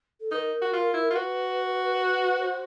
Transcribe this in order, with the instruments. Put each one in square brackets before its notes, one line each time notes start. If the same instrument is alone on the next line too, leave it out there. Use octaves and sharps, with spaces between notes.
[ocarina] A4
[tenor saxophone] D#4 [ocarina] B4
[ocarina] A#4
[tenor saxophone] F#4
F4
E4
F4
[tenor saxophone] F#4 [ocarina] B4
[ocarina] B4
C5